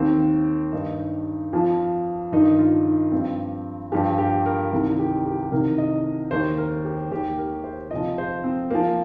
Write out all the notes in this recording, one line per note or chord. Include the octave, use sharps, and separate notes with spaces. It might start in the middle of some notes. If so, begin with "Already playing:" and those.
Already playing: D#2 D#3 C4
G2 D#3 D#4
F2 F3
G2 D#3 D#4
F4
D#4
G2 F3 C4
G2 F3 G4
G4
A#4
C2 C3 D#3 A#4
G4
G4
C2 C3 D#3 A#4
D#5
D#2 D#3 C5
A#4
G4
D#2 D#3 G4
A#4
C5
F2 C3 F3 D#5
C5
C4
F2 F3 A#3